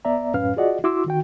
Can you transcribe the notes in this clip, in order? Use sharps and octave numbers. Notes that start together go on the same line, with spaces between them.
C2 B3 D5 E5 A#5
F#2 A2 C#4 B4 F5 F6
F4 F#4 G#4 D5 D#5 F#5
E4 F#4 C6 D6 E6
D#3 F#4 G5